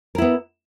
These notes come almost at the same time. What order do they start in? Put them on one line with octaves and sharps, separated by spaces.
A#4 E4 B3